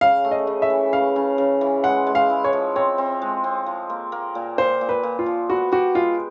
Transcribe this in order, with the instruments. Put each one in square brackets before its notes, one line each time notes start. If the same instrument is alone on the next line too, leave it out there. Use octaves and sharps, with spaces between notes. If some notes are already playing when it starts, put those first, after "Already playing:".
[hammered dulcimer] C#3 [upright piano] F5
[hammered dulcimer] A3
[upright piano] D#5
[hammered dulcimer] C#3
[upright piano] E5
[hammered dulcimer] E3
[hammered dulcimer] C#3 [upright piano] F5
[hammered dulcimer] C#3
C#3
E3
[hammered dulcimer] G#3 [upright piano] F#5
[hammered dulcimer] G#3
[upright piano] F5
[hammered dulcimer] E4
[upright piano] C#5
[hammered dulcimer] F3
[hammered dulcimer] C4 [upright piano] C#5
[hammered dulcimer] C4
G#3
C4
F3
A#3
A#3
A#2
[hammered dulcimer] A#2 [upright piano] C5
[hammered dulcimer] A#2
[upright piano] B4
[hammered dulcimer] A#2
[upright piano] F4
[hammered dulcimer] F3
[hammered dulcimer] B3 [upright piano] F#4
[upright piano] F#4 [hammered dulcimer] G4
[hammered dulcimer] G#3 [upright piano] F4